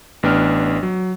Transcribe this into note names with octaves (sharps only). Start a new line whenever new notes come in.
A1 B3 D4 G5 F6
F#3